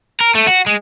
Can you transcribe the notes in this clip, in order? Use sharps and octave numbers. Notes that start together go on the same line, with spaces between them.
A#4
A3
F#4
G#3